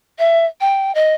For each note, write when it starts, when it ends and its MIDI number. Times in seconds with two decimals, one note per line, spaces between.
0.19 0.45 76
0.61 0.94 79
0.95 1.15 75